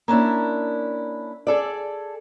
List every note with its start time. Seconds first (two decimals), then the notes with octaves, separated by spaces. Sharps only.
0.08 A#3 C#4 D4 E4
1.47 G#4 A4 D5